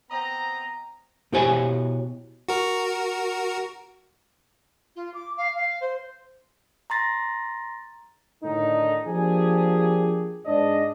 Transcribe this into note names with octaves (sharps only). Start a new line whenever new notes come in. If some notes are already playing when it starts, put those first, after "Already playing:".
B3 C4 D#5 A#5
B2 E4 G4 C5 C#5 G#5
F#4 A#4
F4
D6
F5
F5
C5
A#5 C6 A6 A#6
A2 D3 D#3 D4 D#4
F3 A#3 D4 G4 G#4
G#2 D4 D5 D#5